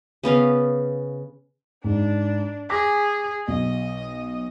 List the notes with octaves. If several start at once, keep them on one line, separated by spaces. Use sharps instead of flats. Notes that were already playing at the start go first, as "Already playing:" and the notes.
C#3 B3 C#4 F5
G#2 D4
G#4 D6 A#6 B6
B1 D#5